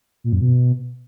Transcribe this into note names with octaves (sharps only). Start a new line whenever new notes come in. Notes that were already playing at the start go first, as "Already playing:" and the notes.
A#2
F#2
B2